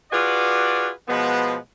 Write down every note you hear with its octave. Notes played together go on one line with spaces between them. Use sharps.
F4 F#4 G#4 B4 D5
B2 F3 G#3 B3